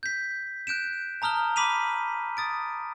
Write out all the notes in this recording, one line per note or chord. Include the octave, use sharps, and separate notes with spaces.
G6 B6
F#6 G6 D7 E7
A5 A#5 D#6 F6 G7
B5 D6 B6 D#7 F7
D#6 A6 D7